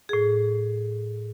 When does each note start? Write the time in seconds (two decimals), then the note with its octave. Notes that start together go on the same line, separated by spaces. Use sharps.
0.09 A2 G#4